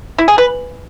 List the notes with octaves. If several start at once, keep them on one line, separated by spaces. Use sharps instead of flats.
E4
G#4
B4